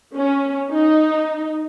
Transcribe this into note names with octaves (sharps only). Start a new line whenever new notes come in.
C#4
D#4